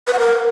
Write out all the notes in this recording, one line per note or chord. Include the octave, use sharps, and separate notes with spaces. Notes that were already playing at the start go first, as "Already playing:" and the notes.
B4
F#5
A#4